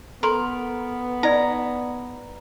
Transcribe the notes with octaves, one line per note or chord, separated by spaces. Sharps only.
B3 A4 A#4 C6
D#4 D5 G#5 A#5